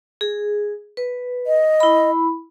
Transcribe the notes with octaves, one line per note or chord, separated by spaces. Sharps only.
G#4
B4
D#5
E4 B5